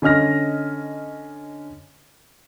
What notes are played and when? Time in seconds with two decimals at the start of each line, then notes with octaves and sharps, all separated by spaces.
0.02 D3 C#4 D#5 F6 A#6